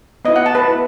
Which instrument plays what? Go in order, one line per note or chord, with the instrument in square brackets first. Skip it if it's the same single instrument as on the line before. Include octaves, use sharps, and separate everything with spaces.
[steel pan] B3 E4 D#5
F#5
A5
B4
B3 E4